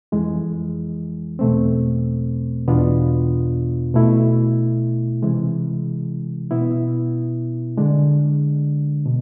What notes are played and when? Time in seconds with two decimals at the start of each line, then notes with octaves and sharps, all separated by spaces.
0.12 F2 E3 G#3
1.39 E2 B2 A3 C4
2.68 E2 B2 B3 D4 F4
3.94 B2 A3 E4
5.23 C3 E3 G#3
6.51 B2 B3 E4
7.77 D3 G#3 D4
9.06 B2